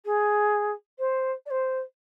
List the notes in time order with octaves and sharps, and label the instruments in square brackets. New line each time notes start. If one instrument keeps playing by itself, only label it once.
[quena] G#4
C5
D5
C5